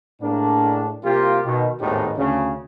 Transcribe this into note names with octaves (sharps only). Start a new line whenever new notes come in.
A2 G#3 A#3 D4
C2 A#3 F4 G4
B2 D#3
G#1 D#2 A2 B3 D#4 G4
D2 C#3